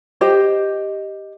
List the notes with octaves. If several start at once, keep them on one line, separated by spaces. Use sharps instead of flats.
G4 C5 D#5